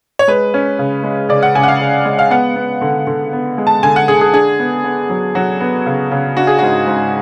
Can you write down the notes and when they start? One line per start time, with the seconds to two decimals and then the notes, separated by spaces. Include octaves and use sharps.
0.19 C#5
0.28 G#3 B4
0.54 C#4
0.79 C#3
1.04 G#3
1.29 C#3 D5
1.43 F#5
1.55 C#3 G#5
1.63 F#5
1.68 F5
1.80 C#3
2.05 G#3
2.19 F5
2.30 B3 F#5
2.56 B3
2.81 D3
3.07 D3
3.33 B3
3.58 G#3
3.67 A5
3.83 D3 G#5
3.96 F#5
4.08 D3 G#4
4.21 G#4
4.33 D4 G#4
4.59 B3
4.84 B3
5.10 F#3
5.35 F#3 F#4
5.61 B3
5.86 C#3
6.11 C#3
6.37 D4 F#4
6.47 G#4
6.59 G#2 F#4
6.87 G#2